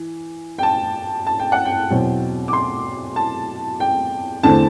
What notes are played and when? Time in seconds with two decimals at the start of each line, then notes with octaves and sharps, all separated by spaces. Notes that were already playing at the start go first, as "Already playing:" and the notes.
Already playing: E3
0.58 G5
0.63 A5
1.27 A5
1.39 G5
1.52 F#5
1.65 G5
1.90 E2 B2 F#3 C4
2.48 D6
2.53 C6
3.16 A5
3.80 G5
4.43 E2 D3 A3 C4 A5